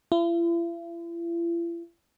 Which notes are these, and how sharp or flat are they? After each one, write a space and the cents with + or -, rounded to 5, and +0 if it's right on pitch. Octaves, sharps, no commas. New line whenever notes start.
E4 +45